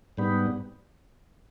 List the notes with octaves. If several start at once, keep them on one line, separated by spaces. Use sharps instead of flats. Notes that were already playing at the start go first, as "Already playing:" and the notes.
G#2 G3 B3